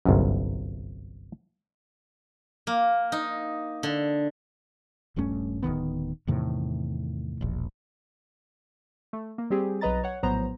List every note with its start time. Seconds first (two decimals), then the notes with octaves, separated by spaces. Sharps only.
0.05 G1 C2 F#2
2.67 A#3
3.12 D#4
3.83 D3
5.16 D#1 G2 A3 C#4
5.63 D1 G#1 D#3 B3
6.27 E2 A2 C3 D#3
7.41 E1 A#1
9.13 A3
9.38 A#3
9.50 G3 C4 G4 G#4
9.81 B1 F#3 B4 D#5 A#5 A6
10.03 C#5 F#5
10.23 A#1 A2 F#3 B3 C5 A#5